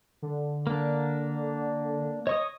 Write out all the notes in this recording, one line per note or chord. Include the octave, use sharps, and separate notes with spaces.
D3
A#3 D4
C#5 D#5 C#6 D#6